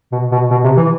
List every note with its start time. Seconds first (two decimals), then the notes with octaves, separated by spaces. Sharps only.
0.12 B2
0.32 B2
0.51 B2
0.64 C3
0.77 E3